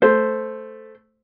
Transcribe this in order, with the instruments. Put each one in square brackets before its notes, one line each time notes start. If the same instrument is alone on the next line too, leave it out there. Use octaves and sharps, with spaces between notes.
[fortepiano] A3 [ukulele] C5